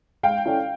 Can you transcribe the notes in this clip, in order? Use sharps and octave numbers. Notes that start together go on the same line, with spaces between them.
G#3 F5 G5
C#4 E4 A4 D5